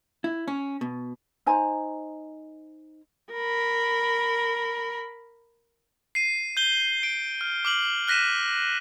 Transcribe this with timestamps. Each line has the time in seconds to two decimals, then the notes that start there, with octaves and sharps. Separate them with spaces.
0.24 E4
0.48 C#4
0.81 B2
1.46 D#4 C5 G#5 A#5
3.33 A#4 B5
6.15 C7 D#7
6.57 G6 G7
7.03 D7
7.41 F6
7.65 D6 F6 F#7
8.08 F6 F#6 A#6 B6 D#7 E7